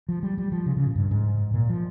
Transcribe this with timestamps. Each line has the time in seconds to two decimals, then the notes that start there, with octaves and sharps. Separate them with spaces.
0.09 F3
0.23 G3
0.38 G3
0.52 F3
0.66 C#3
0.77 C#3
0.87 A#2
0.95 G2
1.11 G#2
1.54 A#2
1.69 F3